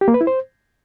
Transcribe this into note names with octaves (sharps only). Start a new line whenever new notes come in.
G4
A#3
B4
E4
C5